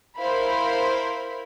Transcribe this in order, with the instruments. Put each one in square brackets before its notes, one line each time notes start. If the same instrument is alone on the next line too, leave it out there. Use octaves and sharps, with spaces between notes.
[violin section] E4 A#4 C5 F5 B5